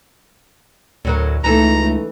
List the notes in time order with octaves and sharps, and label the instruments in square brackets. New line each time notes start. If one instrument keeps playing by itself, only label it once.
[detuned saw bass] D2 [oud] A2 F#3 A#4
[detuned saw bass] C#2 [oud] E3 A4 [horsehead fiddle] A3 D#4 [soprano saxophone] A#5